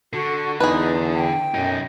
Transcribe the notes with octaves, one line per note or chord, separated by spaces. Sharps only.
D3 F#4 A4
E2 D#4 G#4 B4
G5
B1 F#2 D#4